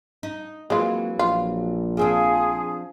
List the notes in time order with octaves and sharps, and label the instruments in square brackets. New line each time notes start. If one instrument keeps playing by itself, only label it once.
[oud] D#4
[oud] E3 F#3 C4 [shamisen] G#3 F4 [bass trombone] A#3
[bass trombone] A#1 [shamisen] F4
[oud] F3 C4 D4 [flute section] G#4